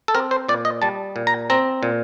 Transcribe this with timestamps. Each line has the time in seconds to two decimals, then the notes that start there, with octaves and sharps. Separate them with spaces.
0.08 A4
0.15 C4 A#4
0.31 C5
0.48 A#2 D5
0.65 D#5
0.82 G3 A5
1.16 A#2
1.27 A#5
1.50 C4 A#5
1.83 A#2